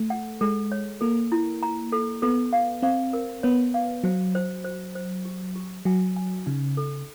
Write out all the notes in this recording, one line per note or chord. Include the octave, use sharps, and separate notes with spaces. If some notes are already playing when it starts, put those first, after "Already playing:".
Already playing: A3
F#5
G#3 A4
C#5
A#3 A4
E4
A#5
A4
B3 A4
F5
C4 F5
A#4
B3 C#5
F5
F#3 C5
C5
C5
C5
G4
G4
F#3 G#5
G#5
C#3 D#4
A4